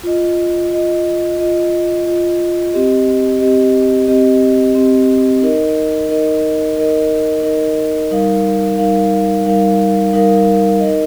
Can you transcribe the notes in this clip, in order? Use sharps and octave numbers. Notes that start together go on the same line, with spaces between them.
F4 D#5
F4 D#5
F4 D#5
F4 D#5
C4 G4 D#5
C4 G4 D#5
C4 G4 D#5
C4 G4 D#5
D#4 A#4 D#5
D#4 A#4 D#5
D#4 A#4 D#5
D#4 A#4 D#5
G3 D#4 A#4 F5
G3 D#4 A#4 F5
G3 D#4 A#4 F5
G3 D#4 A#4 F5
D#4 A#4 D#5